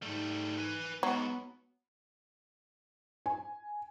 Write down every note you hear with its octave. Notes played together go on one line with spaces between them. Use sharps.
G#2 G3 A3
B4 G#5
G#2 F#3 B3
G#5